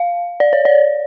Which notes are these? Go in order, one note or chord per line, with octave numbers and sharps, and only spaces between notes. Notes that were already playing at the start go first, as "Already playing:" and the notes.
Already playing: F5
D5
C#5
D5